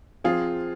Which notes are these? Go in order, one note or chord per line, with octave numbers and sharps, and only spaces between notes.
F3 C4 F4 G#4